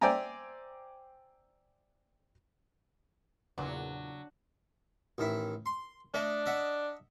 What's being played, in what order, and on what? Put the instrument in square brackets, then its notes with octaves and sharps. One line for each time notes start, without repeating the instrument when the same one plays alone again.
[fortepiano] C5 D5 E5 G5 G#5 A#5
[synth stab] E2 A#2 [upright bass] C#3 A#3 [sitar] F#3 [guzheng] D4
[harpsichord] A1 D#3 E4
C6
[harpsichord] A3 D#5 [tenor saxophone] D4
[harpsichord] D#5 E5 F#5